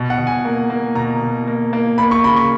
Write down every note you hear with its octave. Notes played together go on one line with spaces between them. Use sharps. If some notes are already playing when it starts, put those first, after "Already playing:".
Already playing: B2
F#5
B2
G#5
A#3
A#3
B2 A#5
B2
A#3
A#3
A#3 B5
C#6
C#3 B5
C#6